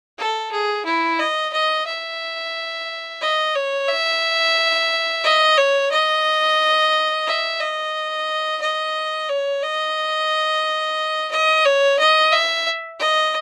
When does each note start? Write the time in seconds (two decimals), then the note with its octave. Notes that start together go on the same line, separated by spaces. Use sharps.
0.18 A4
0.51 G#4
0.85 E4
1.19 D#5
1.53 D#5
1.87 E5
3.22 D#5
3.55 C#5
3.89 E5
5.24 D#5
5.58 C#5
5.91 D#5
7.27 E5
7.60 D#5
8.61 D#5
9.29 C#5
9.63 D#5
11.31 D#5
11.65 C#5
11.99 D#5
12.32 E5
13.00 D#5